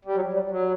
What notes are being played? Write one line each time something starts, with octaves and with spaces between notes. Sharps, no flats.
G3
F#3
G3
F#3